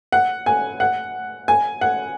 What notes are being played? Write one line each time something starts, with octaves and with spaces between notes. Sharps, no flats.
F#5
G#5
F#5
G#5
F#5